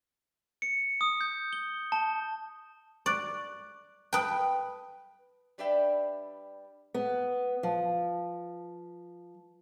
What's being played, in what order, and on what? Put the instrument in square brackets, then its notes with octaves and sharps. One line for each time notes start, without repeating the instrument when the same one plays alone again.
[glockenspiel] C#7
D#6
G6
G7
A5
[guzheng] D5 [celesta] C#6 D6 F#6
[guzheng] B4 G5 [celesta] A5 D#6
[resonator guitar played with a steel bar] G3 D4 B4 D5 E5 G5
[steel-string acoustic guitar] B3
F3